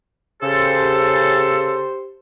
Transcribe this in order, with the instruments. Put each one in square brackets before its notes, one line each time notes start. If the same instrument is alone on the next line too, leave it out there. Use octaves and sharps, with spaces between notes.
[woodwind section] C#3 A4 [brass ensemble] G4 C5